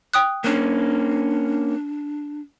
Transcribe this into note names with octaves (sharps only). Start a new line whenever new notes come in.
G5 D#6 F#6
A#3 C#4 D4